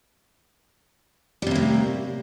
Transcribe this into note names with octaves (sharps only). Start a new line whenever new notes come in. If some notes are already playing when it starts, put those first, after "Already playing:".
A2 C3 G3 A#3